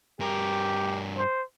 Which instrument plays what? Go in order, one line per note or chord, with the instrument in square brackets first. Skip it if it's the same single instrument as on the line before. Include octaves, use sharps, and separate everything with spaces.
[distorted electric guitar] G2 A#4 [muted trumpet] G4
[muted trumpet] C5